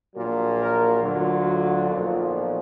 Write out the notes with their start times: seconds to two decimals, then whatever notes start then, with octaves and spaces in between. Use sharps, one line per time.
0.14 A#1 A#2 F#3 A#4
0.58 A#4
1.02 D2 D3 F#3 F4
1.88 B1 A#2 F3